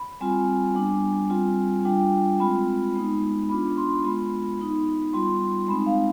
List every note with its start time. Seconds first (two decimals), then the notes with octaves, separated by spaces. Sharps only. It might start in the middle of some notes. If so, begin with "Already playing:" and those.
Already playing: B5
0.21 G3 C4 F4 G#5
0.75 G3 B3 D4
1.30 G3 C4 F4
1.85 G3 D4 F4 G5
2.39 G#3 C4 F4 B5
2.95 G#3 B3 D#4
3.49 B3 D4 F4 B5
3.77 C6
4.04 G#3 B3 F4 B5
4.59 B3 D#4
5.13 G3 B3 F4 C6
5.68 G#3 C4 D#4 B5
5.86 F5